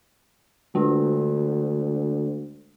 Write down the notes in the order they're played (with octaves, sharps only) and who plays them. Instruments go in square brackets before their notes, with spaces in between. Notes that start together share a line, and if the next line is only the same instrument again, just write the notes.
[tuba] D2 [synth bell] G#3 D4